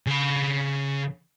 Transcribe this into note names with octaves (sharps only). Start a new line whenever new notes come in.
C#3 B5